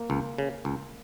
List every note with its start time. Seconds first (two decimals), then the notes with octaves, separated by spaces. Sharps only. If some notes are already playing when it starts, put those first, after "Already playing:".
Already playing: A#3
0.10 C#2
0.38 C#3
0.65 C#2